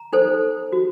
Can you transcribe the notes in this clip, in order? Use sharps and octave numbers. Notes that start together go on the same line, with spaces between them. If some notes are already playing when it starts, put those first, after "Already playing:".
Already playing: A#5
D#4 A4 C5
F#4